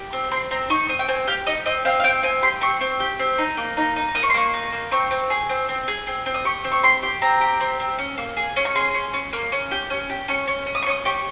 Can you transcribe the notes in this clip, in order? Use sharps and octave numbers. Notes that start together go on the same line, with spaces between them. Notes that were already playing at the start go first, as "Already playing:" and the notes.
Already playing: G4
C4
C4 C6
C4 A#5
D#4 C#6
C4 D#6
G5
C4 G#5
G4 F5
D#4 D#5
C4 D#5
C4 F5
F5
C4 G5
C4 G#5
G4 C6
C4 C#6
C4
G4
C4
D#4
A#3
D#4
D#4
A#3 D#6
C#6
C6
A#3 C#6
D#4
A#3
C4 C#6
C4
G#4
C4
C4
G#4
C4
C4
D#6
G4 C#6
C4
C#6
G4 C6
G4
C4 A#5
G4
C4
C4
C#4
A#3
G#4
C#4
C#6
G#4 C6
C#4
C#4
A#3
C#4
G4
C#4
G4
C#4 C#6
C#4
C#4
D#6
C#6
C#4 D#6
G4 C#6